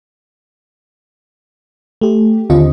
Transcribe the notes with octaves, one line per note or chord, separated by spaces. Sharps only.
A3 G4
D#2 D3 C4 F4 D#5